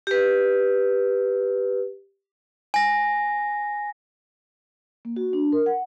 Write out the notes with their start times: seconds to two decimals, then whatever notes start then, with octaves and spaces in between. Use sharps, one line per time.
0.07 G4 B4
2.74 G#5 A#6
5.05 A#3
5.17 F#4
5.33 D4
5.53 A#4
5.66 F#5